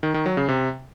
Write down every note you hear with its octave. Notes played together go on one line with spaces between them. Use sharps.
D#3
D#3
F#3
C#3
C3